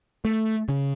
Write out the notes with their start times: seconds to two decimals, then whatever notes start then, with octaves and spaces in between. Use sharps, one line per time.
0.25 A3
0.69 C#3